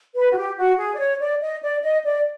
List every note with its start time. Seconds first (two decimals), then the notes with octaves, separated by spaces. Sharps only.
0.15 B4
0.32 F#4
0.36 G4
0.58 F#4
0.78 G#4
0.94 D5
0.99 C#5
1.20 D5
1.42 D#5
1.62 D5
1.83 D#5
2.05 D5